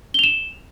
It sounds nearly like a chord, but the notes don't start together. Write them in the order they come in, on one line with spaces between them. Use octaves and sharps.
G7 F7 E7